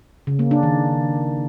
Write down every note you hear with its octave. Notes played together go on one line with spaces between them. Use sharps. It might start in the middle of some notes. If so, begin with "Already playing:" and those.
C#3
A#3
D4
D#3